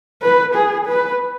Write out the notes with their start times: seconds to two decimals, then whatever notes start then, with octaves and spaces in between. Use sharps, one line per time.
0.22 B4
0.55 G#4
0.87 B4